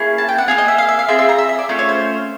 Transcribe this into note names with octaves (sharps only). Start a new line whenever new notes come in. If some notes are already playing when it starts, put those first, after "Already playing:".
Already playing: A#3 C#4 E4 G#4
A5
G5
F#5
A#3 D#4 G#4 F5
D#5
E5
F5
E5
F5
C4 F4 G#4 E5
E5
A#5
E5
E5
D5
A3 C#4 F4
C#5
C5